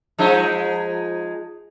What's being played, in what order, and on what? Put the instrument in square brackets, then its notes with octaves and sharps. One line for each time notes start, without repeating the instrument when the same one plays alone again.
[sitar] F3 G#3 D#4